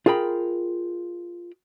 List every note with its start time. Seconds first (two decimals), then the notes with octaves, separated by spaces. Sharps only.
0.06 F4 G#4 A#4 G5 B5